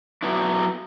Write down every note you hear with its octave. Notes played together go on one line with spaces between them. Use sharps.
F#3 B3 D4 E4